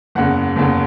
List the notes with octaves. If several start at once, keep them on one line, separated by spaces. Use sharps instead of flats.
F#1 E2 C#3 F#5
F#1 E2 C#3